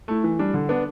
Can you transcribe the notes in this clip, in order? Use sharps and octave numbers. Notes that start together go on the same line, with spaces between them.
A3 E4
E3
G3 D4
D3
B3 D4